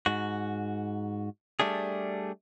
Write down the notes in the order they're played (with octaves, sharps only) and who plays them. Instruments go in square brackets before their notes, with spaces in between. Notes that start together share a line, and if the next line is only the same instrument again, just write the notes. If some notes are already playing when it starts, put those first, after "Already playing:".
[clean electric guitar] G#2 F#4
G3 A3 D4 G#4